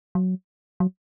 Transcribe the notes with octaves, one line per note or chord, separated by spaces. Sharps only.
F#3
F#3